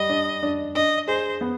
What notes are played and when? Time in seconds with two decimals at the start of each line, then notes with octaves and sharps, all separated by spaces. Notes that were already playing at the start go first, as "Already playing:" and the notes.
Already playing: G3 D#5
0.09 D4
0.43 D4
0.75 D4 D#5
1.08 G#4 C5
1.41 B3